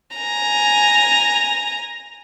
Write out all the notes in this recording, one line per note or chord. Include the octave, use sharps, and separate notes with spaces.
G#5 A#5